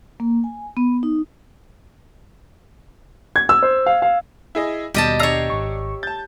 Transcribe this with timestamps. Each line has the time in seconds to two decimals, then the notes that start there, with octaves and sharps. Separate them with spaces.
0.20 A#3
0.44 G#5
0.77 B3
1.03 D#4
3.36 G#6
3.49 E6
3.62 C5
3.86 F5
4.02 F5
4.55 E4 G#4 D#5
4.94 D#2 B2 G3 G4 D#5 A5
5.19 D4 C#5 A#5 E6 C7
5.50 G#1 C#6
6.03 A5 G6 A6